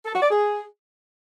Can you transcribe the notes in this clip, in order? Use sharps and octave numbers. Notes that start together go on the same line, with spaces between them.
A4
F#4
D5
G#4